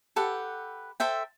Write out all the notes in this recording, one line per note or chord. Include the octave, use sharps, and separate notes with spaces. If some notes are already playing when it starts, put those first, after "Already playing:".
G4 A4 B4 F#5
A4 C5 E5 G5